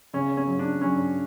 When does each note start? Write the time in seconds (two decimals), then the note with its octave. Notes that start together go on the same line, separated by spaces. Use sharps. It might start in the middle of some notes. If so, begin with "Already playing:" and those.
0.14 C#3 C#4
0.37 C#4
0.47 F#3
0.59 D4
0.81 F#3 C#4